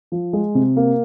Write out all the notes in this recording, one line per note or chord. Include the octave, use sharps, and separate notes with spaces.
F3
G#3
C3
A#3